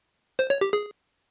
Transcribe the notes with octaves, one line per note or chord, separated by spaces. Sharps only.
C5
C#5
G4
G#4